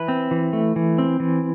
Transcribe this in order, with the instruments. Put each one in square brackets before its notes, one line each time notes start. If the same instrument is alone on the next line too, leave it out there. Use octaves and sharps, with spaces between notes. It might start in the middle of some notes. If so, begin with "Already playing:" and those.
Already playing: [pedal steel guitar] E3 B4
C4
E3
A3
E3
C4
E3